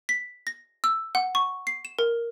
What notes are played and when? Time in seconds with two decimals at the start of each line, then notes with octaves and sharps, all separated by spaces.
0.09 B6
0.47 A#6
0.84 E6
1.15 F#5
1.35 C#6
1.67 C7
1.85 E7
1.99 A#4